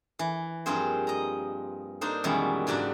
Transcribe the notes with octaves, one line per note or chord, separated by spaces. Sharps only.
E3
G2 F3 A#3 C4 G#4 C5
D#5 A#5
A#3 D4 D#4 C5
F#2 B2 D#3 E3 G3 G#3
G#2 C#3 F#3 D4 F#4 G4